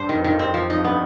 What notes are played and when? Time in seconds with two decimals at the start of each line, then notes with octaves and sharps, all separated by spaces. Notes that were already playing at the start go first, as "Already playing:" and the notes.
Already playing: G2 C5
0.09 F2 D#3
0.24 D#3
0.39 C4
0.54 F3
0.69 G2 D#4
0.84 B3